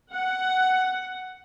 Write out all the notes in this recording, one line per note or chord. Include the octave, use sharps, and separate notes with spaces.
F#5